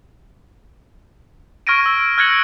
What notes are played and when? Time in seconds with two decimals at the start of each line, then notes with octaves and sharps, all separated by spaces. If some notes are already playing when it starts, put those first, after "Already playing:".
1.67 C#6 F6 G#6 A#6 D7 D#7
1.86 E6
2.18 F6 F#6 G#6 A#6 C#7 F#7